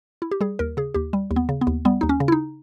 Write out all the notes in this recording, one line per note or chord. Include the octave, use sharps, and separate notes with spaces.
E4
G4
G3 G#4
D#2 A#4
C#3 G#4
D#2 G4
G3
D#2
B3
C#3
B3
D#2
G3 B3
D#2 D#4
C#4
C#3
E4
D#4